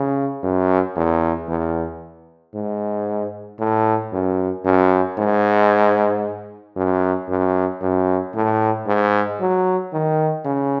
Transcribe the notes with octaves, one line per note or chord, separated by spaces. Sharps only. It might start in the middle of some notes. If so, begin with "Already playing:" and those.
Already playing: C#3
F#2
E2
E2
G#2
A2
F#2
F#2
G#2
F#2
F#2
F#2
A2
G#2
F#3
D#3
C#3